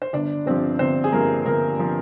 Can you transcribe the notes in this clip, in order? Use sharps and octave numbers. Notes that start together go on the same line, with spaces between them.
C5
G1 D4 D5
G2 F3 C4 C5
G1 C4 C5
G#4
G2 F3 A#3 A#4
G1 A#3 A#4
F3